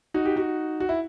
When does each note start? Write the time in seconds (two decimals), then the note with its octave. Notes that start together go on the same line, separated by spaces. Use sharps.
0.14 D#4 F#4
0.25 G4
0.36 D#4 F#4
0.80 F#4
0.89 E4